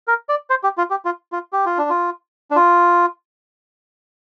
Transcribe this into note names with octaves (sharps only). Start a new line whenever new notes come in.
A#4
D5
C5
G4
F4
G4
F4
F4
G4
F4
D4
F4
D4
F4